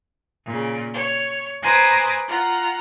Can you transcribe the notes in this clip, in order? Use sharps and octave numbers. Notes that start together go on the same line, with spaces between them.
A#2 C#3
C#5
B4 C5 G#5 A#5 D6 D#6
F4 F#5 A#5